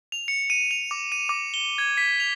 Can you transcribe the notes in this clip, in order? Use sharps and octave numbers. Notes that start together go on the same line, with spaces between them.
F7
C#7
D#7
F7
D6
D#7
D6
G7
G#6
B6
F7